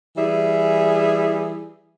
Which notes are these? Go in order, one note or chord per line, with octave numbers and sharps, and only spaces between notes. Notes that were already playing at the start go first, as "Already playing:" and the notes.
E3 G3 G#4 E5